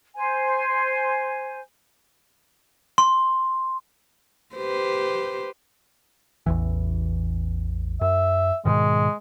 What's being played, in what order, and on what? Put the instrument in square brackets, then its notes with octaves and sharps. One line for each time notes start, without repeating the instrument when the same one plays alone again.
[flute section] C5 G#5
[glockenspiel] C6
[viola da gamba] G4 B4 C5
[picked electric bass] A1 E2 E3
[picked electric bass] F#2 [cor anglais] E5
[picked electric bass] G#2 B2 D#3 [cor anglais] G#3